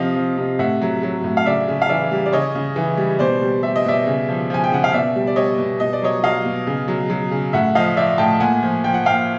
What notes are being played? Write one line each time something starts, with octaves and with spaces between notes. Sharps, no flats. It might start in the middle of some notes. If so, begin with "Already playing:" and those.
Already playing: C3 F3 D#5 F5
F3
C3
A2 E5 F#5
F#3
F#3
A2
F5
C#3 D5 E5
C#3
F5
E3 D5 E5
G3
D5
C#3 C#5 D#5
C#3
E3
G3
B2 C5 D5
G3
G3 E5
D#5
B2 D5 E5
C#3
F3
F3 G#5
G5
C#3 F#5
F5
B2 D5 E5
G3
D5
G3 C#5 D#5
B2
B2 D#5
D5
F#3 C#5 D#5
F#3 D#5 F5
B2
C#3
F#3
F#3
C#3
A2 E5 F#5
F3 D#5 F5
F3 D5 E5
A2 G5 A5
A#2 F#5 G#5
F3
F3 G5
F#5
A#2 F5 G5